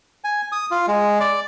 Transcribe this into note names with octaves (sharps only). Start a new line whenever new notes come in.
G#5
D#6
F4
G#3
D5